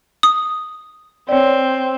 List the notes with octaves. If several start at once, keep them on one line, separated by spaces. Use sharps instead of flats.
D#6
C4 C#5 D5